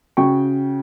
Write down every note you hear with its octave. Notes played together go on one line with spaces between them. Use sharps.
C#3 F#4 G5 C#6